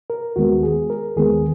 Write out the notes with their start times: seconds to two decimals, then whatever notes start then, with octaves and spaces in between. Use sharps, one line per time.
0.10 A#4
0.36 D#2 D#3 G#3 B3 F#4
0.63 G#4
0.90 A#4
1.16 D#2 D#3 G#3 B3 G#4